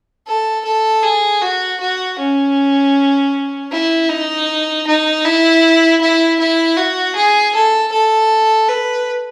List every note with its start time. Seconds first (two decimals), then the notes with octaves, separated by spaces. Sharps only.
0.27 A4
0.65 A4
1.03 G#4
1.42 F#4
1.80 F#4
2.19 C#4
3.72 E4
4.09 D#4
4.86 D#4
5.25 E4
6.01 E4
6.39 E4
6.77 F#4
7.15 G#4
7.54 A4
7.92 A4
8.68 B4